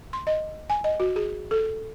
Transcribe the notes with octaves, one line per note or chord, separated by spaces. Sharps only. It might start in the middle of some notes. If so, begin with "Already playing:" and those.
C6
D#5
G#5
D#5
F#4
G#4
A4